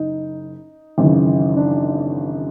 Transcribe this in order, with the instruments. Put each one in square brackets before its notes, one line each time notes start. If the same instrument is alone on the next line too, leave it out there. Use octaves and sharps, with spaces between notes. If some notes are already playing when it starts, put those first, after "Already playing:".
Already playing: [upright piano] F#1 D#4
G#1 F#2 C#3 E3
D4